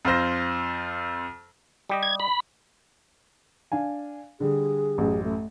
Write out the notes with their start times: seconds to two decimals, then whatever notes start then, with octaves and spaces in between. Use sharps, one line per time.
0.05 F2 F4 C5 A#6
1.89 G3 G4 D#5
2.03 G#6
2.20 B5
3.72 D4 F5 G#5
4.40 D3 G3 G#4
4.98 A1 F#2
5.23 A3